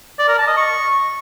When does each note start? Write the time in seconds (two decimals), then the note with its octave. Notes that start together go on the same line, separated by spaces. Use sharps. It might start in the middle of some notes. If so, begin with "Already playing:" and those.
0.19 D5
0.28 A#4
0.38 A5
0.47 D#5
0.57 C#6